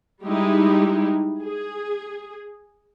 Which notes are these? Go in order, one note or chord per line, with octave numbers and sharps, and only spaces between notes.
G3 G#3 D#4 E4 G4
G#4